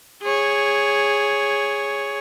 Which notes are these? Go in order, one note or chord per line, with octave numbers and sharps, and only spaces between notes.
G#4 C#5